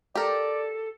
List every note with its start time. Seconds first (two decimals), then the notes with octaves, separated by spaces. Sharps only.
0.15 G4 A4 A#4 D5